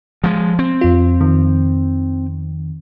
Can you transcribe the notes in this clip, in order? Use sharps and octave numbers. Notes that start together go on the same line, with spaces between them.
F3 G#3
C4
F2 F4
F2 D#3